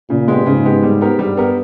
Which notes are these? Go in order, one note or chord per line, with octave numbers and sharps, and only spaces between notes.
A#2 C#3
G#3 B3 G4
G#2 C#3
G#3 B3 G4
G3
B3 G4 A#4
G2 G3
B3 G4 A#4